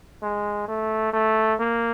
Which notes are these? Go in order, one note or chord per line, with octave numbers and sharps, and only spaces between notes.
G#3
A3
A3
A#3